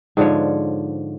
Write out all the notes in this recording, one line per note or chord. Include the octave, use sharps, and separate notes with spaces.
G#2 D3 F3 C#5